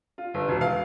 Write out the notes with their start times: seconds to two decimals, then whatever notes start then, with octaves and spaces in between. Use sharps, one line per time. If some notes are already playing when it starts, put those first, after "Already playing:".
0.18 F4
0.34 G1
0.49 E1
0.61 F5